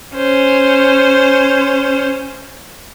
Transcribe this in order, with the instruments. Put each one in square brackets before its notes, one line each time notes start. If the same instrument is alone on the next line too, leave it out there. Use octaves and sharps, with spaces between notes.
[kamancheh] C#4 C5